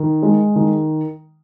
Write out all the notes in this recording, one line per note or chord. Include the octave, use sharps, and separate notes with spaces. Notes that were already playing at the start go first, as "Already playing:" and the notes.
Already playing: D#3
G#3
D#3